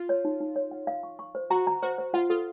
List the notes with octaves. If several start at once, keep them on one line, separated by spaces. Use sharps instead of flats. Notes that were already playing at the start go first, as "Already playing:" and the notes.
Already playing: F4
C#5
D#4
D#4
C#5
F#5
F5
C#6
C#6
C5
F#4 A#5
A#5
F#4 C5
C5
F4 F#5
F4 A4